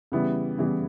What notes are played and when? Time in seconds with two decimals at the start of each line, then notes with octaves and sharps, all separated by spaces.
0.12 C#3 E3 G3 B3 E4
0.58 C#3 E3 G3 B3 E4